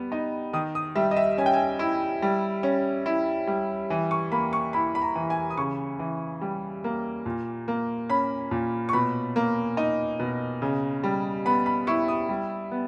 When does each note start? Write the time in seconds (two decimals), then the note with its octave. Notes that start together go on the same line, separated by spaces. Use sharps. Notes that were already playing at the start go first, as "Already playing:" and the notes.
Already playing: G3 B3
0.12 D#4
0.53 D#3 D#6
0.75 D#6
0.96 G3 E5
1.11 D#5
1.16 E5
1.38 C#4 G#5
1.46 G5
1.53 G#5
1.79 E4
2.22 G3
2.63 C#4
3.06 E4
3.47 G3
3.90 E3
4.11 C#6
4.32 A#3 B5
4.53 C#6
4.73 E4 B5
4.95 B5
5.02 A#5
5.15 E3
5.30 G#5
5.50 D#6
5.57 C#3 C#6
5.99 E3
6.41 G3
6.84 A#3
7.26 A#2
7.68 A#3
8.09 C#4 B5
8.51 A#2
8.89 C#6
8.93 B2 B5
9.36 A#3
9.77 D#4
10.19 B2
10.62 C#3
11.04 G3
11.46 B3 B5
11.66 B5
11.87 E4 C#6
12.08 D#6
12.29 G3
12.71 B3